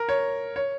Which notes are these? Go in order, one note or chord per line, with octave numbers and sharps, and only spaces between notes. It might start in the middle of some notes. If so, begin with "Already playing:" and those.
Already playing: A#4
C#5
C#5